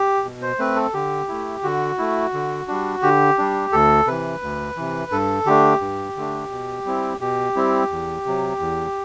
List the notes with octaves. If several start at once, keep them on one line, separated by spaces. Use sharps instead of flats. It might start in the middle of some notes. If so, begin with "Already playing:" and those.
Already playing: G4
B2
C5
A3 C4 B4
A4
D3 G4
A3 E4
D3 F#4
A3 E4
D3
G3 D4
D3 G4
G3 D4
D2 A4
C3 E3 B4
D2
C3 E3
G2 A4
D3 A3 D4 G4
G2
D3 A3 D4
B2
G3 C4 E4
B2 G4
G3 C4 E4
E2
C3 F#3
E2